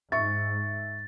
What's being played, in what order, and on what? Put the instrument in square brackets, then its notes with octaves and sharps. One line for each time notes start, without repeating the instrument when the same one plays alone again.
[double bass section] G#2 [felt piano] E5 C#6 [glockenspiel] A6